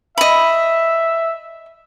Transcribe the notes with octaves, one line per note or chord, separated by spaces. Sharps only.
D#5 E5 B5